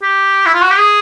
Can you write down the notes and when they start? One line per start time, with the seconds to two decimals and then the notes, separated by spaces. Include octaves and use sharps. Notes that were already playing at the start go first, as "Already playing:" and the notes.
0.02 G4
0.46 E4
0.54 F4
0.62 F#4
0.70 G4
0.79 G#4